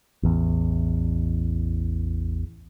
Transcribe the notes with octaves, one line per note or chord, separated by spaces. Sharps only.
A1 E2